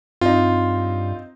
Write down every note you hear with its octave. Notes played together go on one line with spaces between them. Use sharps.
G2 C4 D#4 F4